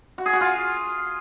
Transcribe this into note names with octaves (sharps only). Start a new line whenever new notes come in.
F#4
G#4
F#4
F4